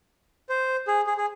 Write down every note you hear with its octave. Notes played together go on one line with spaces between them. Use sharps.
C5
G#4
G#4
G#4